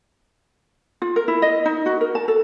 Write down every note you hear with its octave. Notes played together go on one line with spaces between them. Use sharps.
F4
A#4
E4
D#5
D#4
F#4
A#4
A5
A4